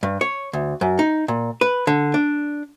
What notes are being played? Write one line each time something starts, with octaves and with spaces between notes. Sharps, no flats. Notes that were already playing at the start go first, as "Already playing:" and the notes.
G2
C#5
D2
F#2
D#4
A#2
B4
D3
D4